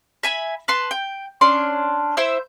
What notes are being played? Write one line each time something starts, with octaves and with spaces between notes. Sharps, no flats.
E5 G#5 B5
B4 A5 C6
G5
C#4 D4 C6
E4 C5 E5 E6